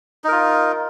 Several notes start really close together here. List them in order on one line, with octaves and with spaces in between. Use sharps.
D#4 A#4 F4